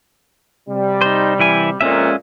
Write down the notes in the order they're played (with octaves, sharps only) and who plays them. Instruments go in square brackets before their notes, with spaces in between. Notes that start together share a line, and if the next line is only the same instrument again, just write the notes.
[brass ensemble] C3 G3
[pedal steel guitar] D#4 C5
E3 E4 G#5
[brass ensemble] F2 A#2 [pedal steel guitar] G#3 C#4 E5